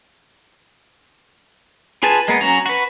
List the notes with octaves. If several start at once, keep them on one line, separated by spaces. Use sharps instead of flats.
F4 G#4 B4 G#5 A5
G#3 A#3 B3
F#3 C#4 F#4 A#5
F#4 B4